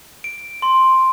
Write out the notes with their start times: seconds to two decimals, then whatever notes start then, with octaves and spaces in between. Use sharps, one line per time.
0.24 D7
0.62 C6